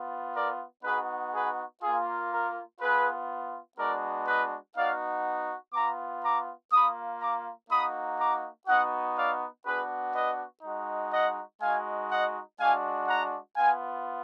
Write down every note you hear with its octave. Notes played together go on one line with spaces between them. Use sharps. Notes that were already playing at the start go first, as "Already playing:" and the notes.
Already playing: B3 F4
A#4 D5
B3 D#4 F#4 G#4 B4
G#4 B4
A#3 F4 G#4
A#4
B3 F4 G#4 B4
G#3 B3 D4 F#4 A#4 D5
B4 D#5
B3 D#4 F#4 D5 F5
B3 F4 A#5 D6
A#5 D6
A#3 F4 B5 D#6
A#5 D6
A#3 D#4 F#4 B5 D#6
A#5 D6
B3 D#4 F#4 D#5 F#5
D5 F5
B3 D4 F#4 G#4 B4
B4 D#5
G#3 D#4 F#4
D#5 F#5
G#3 D#4 F#4 F5 G#5
D#5 F#5
G#3 D4 F#4 F5 G#5
F#5 A#5
B3 F4 F5 G#5